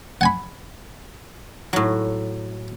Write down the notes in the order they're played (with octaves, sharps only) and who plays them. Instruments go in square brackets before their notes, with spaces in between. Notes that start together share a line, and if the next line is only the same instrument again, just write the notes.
[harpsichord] F#5 G#5 B5
[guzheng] A2 F#3